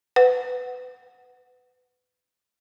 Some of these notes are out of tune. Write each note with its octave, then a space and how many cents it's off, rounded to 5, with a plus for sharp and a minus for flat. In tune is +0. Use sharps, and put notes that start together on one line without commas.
B4 +25 F#5 +0